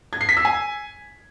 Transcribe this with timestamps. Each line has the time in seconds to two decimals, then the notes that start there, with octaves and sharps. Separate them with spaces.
0.13 G#6
0.21 C7
0.29 B6
0.37 E6
0.45 G#5